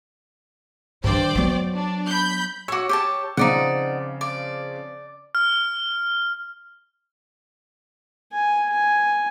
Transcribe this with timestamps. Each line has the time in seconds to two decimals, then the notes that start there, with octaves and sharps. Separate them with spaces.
1.04 G2 D#3 C5 D5 G5
1.35 F#3 B3
1.75 D4
2.07 B5 G6
2.68 F#4 C#5 D6 E6
2.89 G4 C#5 A5
3.37 C#3 F3 C4 D#4 D5 F#5
4.21 D5
5.35 F6
8.32 G#5
8.71 G#5